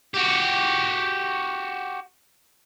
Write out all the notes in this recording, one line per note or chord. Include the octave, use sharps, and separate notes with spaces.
F#4 G4